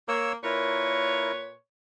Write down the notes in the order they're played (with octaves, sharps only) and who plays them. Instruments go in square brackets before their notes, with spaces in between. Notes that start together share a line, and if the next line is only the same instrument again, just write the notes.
[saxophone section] A#3 [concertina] C#5 E6
[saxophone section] A#2 B4 C#5 [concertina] E4 A#4